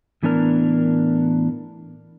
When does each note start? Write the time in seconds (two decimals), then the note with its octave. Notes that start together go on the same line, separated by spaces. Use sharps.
0.23 A2 E3 B3 D4 A#4